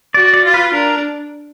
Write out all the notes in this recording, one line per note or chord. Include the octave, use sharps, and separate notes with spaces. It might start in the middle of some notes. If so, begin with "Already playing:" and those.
F#4 D5
D5
F4
B4
D4 A#4